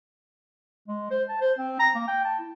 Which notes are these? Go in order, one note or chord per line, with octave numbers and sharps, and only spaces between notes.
G#3
C5
A5
C5
C4
A#5
A#3
G5
A5
E4